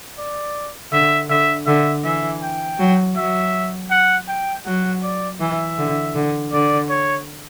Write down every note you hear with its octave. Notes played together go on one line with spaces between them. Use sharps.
D5
D3 E5
D3 E5
D3 E5
E3 E5
G5
F#3
F#3 E5
F#5
G5
F#3 F#5
D5
E3 E5
D3
D3
D3 D5
C#5